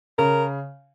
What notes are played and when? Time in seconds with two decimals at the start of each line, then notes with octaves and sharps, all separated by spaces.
0.18 C#3 A#4